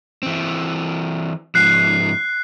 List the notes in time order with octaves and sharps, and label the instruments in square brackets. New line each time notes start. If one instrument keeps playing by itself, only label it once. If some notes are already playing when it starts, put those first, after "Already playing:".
[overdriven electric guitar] E3 C4
[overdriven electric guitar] G#2 F3 [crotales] F#6 C7